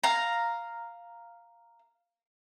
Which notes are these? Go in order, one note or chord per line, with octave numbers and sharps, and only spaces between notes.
F5 A#5